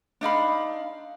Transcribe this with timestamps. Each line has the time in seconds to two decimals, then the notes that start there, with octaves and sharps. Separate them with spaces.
0.21 D4 D#4 F5 B5